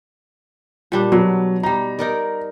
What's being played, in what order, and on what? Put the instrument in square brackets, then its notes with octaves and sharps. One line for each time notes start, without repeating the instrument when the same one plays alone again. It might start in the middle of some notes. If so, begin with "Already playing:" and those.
[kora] A#2 G3 D4
[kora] B2 [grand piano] F#3
[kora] G3 D#4 [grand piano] A#5
[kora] D#4 A#4 D5